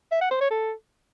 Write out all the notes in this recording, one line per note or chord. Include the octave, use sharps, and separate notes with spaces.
E5
F#5
C5
C#5
A4